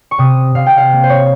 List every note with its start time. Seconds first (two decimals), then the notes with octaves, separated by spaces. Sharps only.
0.11 C#6
0.18 C3 D#6
0.55 C3 F5
0.66 G5
0.78 F5
0.92 A#3
1.04 C5
1.10 C#5